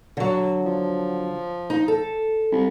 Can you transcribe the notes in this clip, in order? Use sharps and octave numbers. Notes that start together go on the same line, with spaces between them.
D3 F#3
F3
D#4
A4
C2